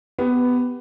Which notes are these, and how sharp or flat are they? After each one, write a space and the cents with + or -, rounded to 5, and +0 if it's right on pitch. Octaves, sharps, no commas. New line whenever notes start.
B3 +10 G4 +0